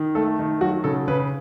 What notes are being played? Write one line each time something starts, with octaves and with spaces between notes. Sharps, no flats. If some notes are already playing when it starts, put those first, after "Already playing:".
Already playing: D#3
A3 A4
D#3
F#3 F#4
C#3 A4
C#3 B4